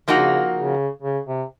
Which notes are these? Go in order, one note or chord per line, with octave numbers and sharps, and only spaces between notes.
C#3 F3 A#3 D#4 F#4
C#3
C#3
C3